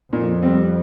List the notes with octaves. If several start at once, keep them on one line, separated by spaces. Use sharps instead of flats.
F2 A#2
G3 C4